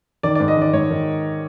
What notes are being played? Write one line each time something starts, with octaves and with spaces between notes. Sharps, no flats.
D#3 D5
D5
G#2
D#5
D#3
D5
G#2 C#5
D#3